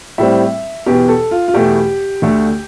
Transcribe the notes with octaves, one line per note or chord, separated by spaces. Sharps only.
A2 G3 C4 E5
E2 B2 B3 G4
A4
F4
F4
E2 B2 A3 G4
D2 D3 A3